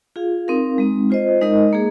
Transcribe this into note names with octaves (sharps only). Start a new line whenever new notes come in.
F4 G#4 F5
C4 D#4 A#4 F5
G#3 C4 D#4
F4 C5 D#5
G#3 D#4 A#4 D#5
A#3 G#4